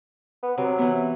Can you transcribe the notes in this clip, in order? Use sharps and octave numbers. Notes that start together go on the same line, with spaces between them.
B3
C3 F#3
E3 B3